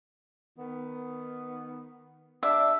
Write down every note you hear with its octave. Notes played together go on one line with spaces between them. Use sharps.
D#3 B3
D4 G4 D5 E5